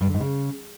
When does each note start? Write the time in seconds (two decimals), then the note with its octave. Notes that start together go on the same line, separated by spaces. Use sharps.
0.01 G2
0.07 D3
0.14 G#2
0.21 C#3